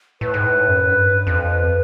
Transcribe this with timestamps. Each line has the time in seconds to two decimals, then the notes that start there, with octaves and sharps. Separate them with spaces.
0.21 A2 B4
0.34 G#2
0.45 A2
0.68 F#2
0.91 G2
1.27 F2